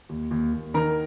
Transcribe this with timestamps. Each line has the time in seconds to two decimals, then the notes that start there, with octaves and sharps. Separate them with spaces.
0.09 D#2
0.31 D#2
0.53 D#2
0.74 D#3 A#4 A#5